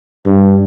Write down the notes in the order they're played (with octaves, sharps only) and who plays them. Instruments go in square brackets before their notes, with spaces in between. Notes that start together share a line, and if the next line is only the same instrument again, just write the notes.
[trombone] G2